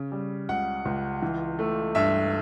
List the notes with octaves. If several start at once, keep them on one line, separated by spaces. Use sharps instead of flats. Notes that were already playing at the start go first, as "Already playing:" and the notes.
Already playing: C#3
G3
C#2 F#5
C#2
E3
A3
G2 E5